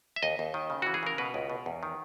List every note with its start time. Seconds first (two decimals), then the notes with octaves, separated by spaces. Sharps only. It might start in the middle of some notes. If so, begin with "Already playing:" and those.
0.16 E5
0.23 D#2 D#5
0.39 D#2
0.54 D#3
0.70 C#3
0.82 E3 F#4
0.94 G#4
1.03 C#3 A#4
1.18 B2 B4
1.34 C#2
1.50 B2
1.66 E2
1.83 D#3